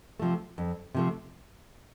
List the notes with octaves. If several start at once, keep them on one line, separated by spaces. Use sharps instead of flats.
C3 F3 A3
F2
C3 F3 A3